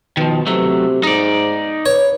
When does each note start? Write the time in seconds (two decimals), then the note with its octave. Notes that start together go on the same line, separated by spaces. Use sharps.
0.17 B2 D#3 F3
0.46 C3 F#3 A3
1.03 G#2 D#4 D5
1.86 B4 C#5